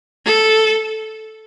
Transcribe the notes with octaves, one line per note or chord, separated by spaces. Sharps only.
A4